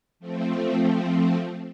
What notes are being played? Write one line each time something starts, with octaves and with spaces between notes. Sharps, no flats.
F3 A3 C4